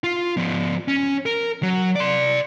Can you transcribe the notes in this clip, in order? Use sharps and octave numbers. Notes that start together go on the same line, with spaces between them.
F4
F3 B3
C#4
A#4
F#3
D5 C6